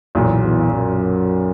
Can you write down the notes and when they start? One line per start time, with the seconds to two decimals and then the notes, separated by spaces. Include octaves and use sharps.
0.15 B1 E2 A#2 F#3
0.43 E2
0.72 F#2